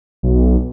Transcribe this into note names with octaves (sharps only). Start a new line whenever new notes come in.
B1